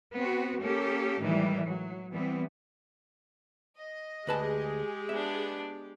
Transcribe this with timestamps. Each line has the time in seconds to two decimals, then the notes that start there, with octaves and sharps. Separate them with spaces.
0.14 B3 C4 F#4
0.62 A#3 C#4 G4 A4
1.20 A2 D#3 E3 G3 G#3
1.66 F#3
2.12 E3 G3 B3 C4
3.76 D#5
4.27 D2 G#3 G4 G#4 B4 A5
5.09 B3 D4 E5